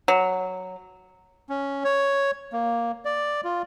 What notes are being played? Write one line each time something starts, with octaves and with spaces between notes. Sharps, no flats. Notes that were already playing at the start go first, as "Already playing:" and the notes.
F#3
C#4
C#5
A#3
D5
F4